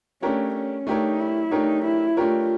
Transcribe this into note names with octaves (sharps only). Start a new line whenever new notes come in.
A3 C#4 D4 G4 A#4 C#5
C#4
A3 D4 D#4 G4 A#4 C#5
E4
A3 D4 D#4 G4 A#4 C#5
E4
A3 D4 F4 G4 A#4 C#5